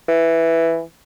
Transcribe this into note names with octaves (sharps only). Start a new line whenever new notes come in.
E3